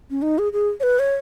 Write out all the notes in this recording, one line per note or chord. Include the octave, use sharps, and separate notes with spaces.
C#4
D#4
G#4
G#4
C#5
B4
C#5